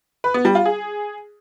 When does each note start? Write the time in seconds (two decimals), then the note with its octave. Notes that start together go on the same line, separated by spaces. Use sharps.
0.24 B4
0.34 B3
0.45 G3
0.55 F4
0.66 G#4